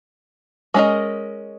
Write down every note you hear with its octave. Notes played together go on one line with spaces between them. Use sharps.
G#3 C#4 E4 A#4 D#5